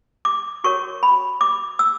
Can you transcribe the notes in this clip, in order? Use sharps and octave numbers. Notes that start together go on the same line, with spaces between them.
D6
F#4 A#4 C#5 C#6
B5
D6
E6